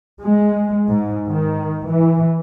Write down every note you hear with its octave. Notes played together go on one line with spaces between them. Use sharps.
G#3
G#2
D#3
E3